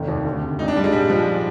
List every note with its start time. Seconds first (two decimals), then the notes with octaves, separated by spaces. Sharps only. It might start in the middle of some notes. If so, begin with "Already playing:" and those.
Already playing: F1 D#3
0.08 D#2
0.25 D2
0.42 C3
0.59 G#1 D#4
0.68 D4
0.76 G2 G3
0.84 G#3
0.92 A#1 G3
1.10 G#2 F3